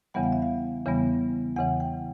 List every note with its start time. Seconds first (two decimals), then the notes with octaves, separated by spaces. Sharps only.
0.14 E2 C#3 E3 G3 B3 F#5
0.23 F5
0.32 E5
0.42 F5
0.86 E2 C#3 E3 G3 B3
1.56 E2 C#3 E3 F#5
1.80 G5